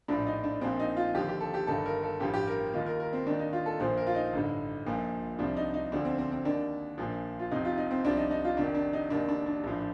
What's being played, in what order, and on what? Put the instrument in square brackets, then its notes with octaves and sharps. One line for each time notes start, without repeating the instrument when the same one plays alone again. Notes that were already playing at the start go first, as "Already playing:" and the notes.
[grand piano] A#1 A2 F3 D4
D#4
D4
A#1 A#2 F3 C4
D#4
F4
D#2 D3 F3 G4
G4
A4
G4
G1 G2 D#3 A4
A#4
A4
A1 G2 F3 G4
G4
A#4
D#2 D#3 F4
A#4
A#4
C4
D#2 D#3 D4
D#4
F4
A4
A#1 A#2 F3 C5
A#4
F4
D#4
A1 G2 D3
A#1 A#2 F3
C2 C3 F3 D4
D#4
D#4
D2 D3 F3 D4
C4
C4
C4
D#2 D#3 D4
A#1 A#2 F3
F4
F1 F2 C3 F3 D#4
F4
D#4
C4
C2 C3 F3 D4
D#4
D#4
F4
F1 F2 D#3 D4
D4
D#4
F1 D#2 D#3 D4
D4
D4
A#1 A2 F3